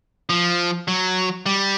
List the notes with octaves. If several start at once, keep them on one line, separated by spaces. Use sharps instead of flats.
F3
F#3
G3